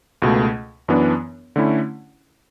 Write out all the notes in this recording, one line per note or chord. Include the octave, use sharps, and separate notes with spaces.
C#2 B2 A3
F#2 E3 B3 D4
D3 A3 C#4 E4